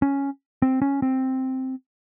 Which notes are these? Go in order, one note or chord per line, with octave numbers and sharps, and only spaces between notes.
C#4
C4
C#4
C4